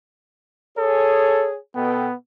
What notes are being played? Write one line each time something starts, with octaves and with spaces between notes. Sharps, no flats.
G#4 A4 C#5
B2 B3 A4 G5